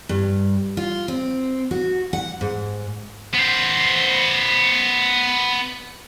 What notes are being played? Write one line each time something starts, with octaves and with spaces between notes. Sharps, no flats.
G2
F4
C4
F#4
F#5
G#2
B3 C5